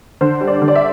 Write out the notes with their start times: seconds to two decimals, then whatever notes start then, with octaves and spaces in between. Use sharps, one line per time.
0.21 D3 C5
0.41 G3
0.48 D5
0.62 D3
0.68 D5
0.75 E5